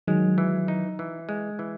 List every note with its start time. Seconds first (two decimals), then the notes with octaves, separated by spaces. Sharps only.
0.07 D#3 F#3 G#3
0.38 E3
0.68 D#4
0.99 E3
1.29 G#3
1.59 E3